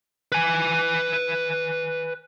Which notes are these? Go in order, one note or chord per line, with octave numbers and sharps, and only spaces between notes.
B4 G#5